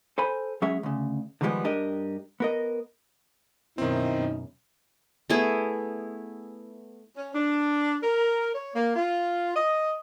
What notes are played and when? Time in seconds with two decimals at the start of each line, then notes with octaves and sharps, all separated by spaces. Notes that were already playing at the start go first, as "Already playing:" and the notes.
0.18 A4 C5 G#5 B5
0.62 F#3 G#3 C#4 G#4 E5
0.83 D2 C#3
1.41 D3 D#3 F3 G3 G#3 B3
1.65 G2 D4 G4 A#4 D#5
2.40 B3 A#4 D#5
3.78 F#2 B2 D#3 C4 D#4 E4
5.30 A3 B3 E4 G#4
7.17 C#4
7.35 D4
8.03 A#4
8.54 C#5
8.75 A#3
8.96 F4
9.56 D#5